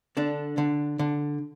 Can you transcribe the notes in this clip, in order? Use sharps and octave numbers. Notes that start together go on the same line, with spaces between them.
D3 D4
D3
D3